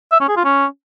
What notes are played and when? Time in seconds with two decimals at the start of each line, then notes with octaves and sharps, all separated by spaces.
0.12 E5
0.20 C#4
0.28 G#4
0.36 F4
0.45 C#4